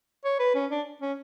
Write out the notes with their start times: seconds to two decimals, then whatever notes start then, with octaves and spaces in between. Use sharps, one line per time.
0.25 C#5
0.39 B4
0.55 C#4
0.71 D4
1.01 C#4